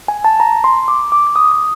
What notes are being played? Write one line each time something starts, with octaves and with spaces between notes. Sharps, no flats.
G#5
A5
A#5
C6
D6
D6
D6
D#6
D#6